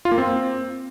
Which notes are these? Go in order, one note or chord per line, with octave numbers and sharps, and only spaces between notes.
F4
A#3
C4